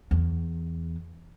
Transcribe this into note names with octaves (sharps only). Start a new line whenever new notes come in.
E2